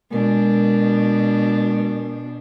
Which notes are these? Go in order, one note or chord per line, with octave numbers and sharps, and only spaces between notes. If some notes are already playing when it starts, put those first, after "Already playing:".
B2 G#3 D4 A#4 G#5